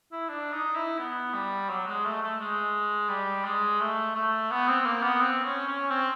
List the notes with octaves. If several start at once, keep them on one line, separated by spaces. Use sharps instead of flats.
E4
D4
D#4
E4
B3
G3
F#3
G#3
A3
A3
G#3
G3
G#3
A3
A3
B3
C4
A#3
B3
C4
C#4
C#4
C4